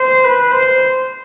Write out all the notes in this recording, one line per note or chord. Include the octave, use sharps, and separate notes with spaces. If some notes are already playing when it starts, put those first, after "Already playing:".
Already playing: C5
B4
C5